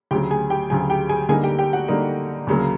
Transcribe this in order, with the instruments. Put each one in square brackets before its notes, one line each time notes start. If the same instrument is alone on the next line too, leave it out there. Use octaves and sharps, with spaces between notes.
[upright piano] D2 C#3 F#3 G4 G5
G#4 G#5
G4 G5
D2 C#3 F#3 G#4 G#5
G4 G5
G#4 G#5
D3 G3 A#3 D#4 G#4 G#5
G4 G5
G4 G5
F#4 F#5
D3 G3 A#3 D#4
D2 C#3 F#3 A#3